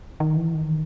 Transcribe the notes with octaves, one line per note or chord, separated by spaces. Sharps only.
D#3
E3
D#3